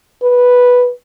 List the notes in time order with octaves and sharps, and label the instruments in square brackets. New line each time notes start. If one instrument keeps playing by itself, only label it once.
[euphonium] B4